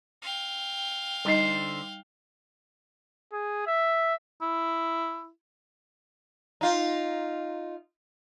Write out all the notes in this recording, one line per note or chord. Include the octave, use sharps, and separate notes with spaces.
F5 G5
D3 G3 D#4 C5 D#5
G#4
E5
E4
D#4 F4